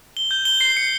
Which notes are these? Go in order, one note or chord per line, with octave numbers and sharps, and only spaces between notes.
G7
G6
G7
C7
C#7